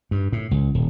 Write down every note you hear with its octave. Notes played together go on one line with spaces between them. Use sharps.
G2
A2
C#2
D#1